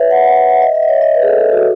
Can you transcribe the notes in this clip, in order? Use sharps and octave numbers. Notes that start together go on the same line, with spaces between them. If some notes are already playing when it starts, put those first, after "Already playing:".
Already playing: B4 C#5 E5
F#5
F#5
F#5
E5
D#5
E5
D#5
C#5
D#5
B4
G#4
A4
G#4
F#4